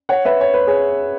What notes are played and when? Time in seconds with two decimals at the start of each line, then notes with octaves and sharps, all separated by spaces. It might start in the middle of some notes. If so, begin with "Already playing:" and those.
0.09 C#5 F#5
0.25 B4 E5
0.41 C#5
0.54 B4
0.67 G#4 C#5